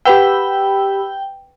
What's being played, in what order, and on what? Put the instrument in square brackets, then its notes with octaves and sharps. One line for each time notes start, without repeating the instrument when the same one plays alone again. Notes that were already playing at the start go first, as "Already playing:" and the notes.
[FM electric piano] G4 B5 E6 [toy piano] B4 F#5 [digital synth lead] G5